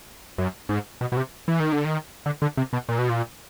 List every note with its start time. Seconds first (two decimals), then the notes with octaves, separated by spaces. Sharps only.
0.38 F#2
0.69 G#2
1.01 B2
1.12 B2
1.17 C3
1.48 E3
1.60 D#3
1.72 D3
1.85 D#3
2.26 D3
2.42 D3
2.57 C3
2.73 B2
2.89 A#2
2.99 B2
3.09 A#2